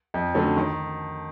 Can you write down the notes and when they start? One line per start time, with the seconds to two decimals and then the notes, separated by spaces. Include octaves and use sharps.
0.14 F2
0.34 D3 F#3 A3 C#4
0.57 D#3